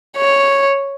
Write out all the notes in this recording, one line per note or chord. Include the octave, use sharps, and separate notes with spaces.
C#5